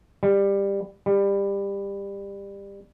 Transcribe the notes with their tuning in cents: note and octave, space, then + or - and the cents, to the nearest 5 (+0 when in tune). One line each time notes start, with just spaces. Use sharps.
G3 +15
G3 +20